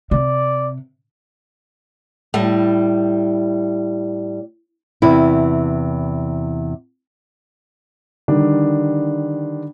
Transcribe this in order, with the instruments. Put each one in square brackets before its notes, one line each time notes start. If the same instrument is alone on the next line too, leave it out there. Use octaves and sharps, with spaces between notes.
[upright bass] C3 [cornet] D5
[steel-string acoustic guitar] A2 G3
[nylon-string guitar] E2 C3 E4
[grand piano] D3 D#3 G3 D4